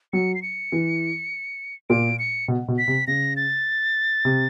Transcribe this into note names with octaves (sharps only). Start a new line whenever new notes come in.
F#3 C#7
C7
C#7
E3
A#2 D7
C#7
B2
B2
B6
C3
C#3 A#6
A6
C3